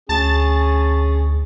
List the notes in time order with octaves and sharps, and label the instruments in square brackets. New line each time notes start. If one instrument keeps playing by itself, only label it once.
[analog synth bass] D2 [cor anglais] C#4 [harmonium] G#4 [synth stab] A5 A6